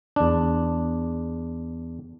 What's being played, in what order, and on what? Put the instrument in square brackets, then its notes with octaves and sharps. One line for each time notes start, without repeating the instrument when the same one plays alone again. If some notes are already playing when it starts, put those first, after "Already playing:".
[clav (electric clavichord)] E2 D4